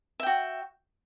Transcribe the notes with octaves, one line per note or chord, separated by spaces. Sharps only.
F#4 E5 G5